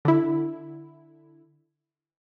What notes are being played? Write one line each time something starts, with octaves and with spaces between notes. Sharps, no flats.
D3 E4